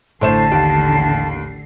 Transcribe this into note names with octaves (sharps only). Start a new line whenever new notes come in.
A1 A2 D3 C5 A5 C7 E7
D#2